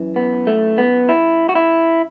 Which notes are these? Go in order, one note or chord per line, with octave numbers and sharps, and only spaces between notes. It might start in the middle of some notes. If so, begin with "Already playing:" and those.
Already playing: F#2 E3
B3
A3
B3
E4
F#4
E4